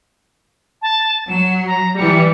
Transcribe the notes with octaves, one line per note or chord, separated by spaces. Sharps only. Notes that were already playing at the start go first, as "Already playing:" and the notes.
A5
F#3 E7
A#5
E3 G3 C#7